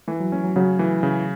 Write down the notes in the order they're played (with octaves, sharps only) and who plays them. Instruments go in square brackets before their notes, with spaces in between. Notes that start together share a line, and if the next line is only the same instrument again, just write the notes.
[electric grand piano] E3 [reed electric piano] A3
[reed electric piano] F#3
[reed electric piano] A3 [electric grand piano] C#4
[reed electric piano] F#3
[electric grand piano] C#3 [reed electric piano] F#3
[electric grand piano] E3 [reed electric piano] A3
[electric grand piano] C#3